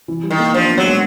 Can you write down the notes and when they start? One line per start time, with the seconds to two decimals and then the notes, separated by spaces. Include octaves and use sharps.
0.08 E3
0.23 G3
0.31 D#3
0.39 A#3
0.54 F3 D4
0.69 B3
0.78 F#3
0.85 G#3